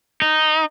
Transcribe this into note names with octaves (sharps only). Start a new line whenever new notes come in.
D#4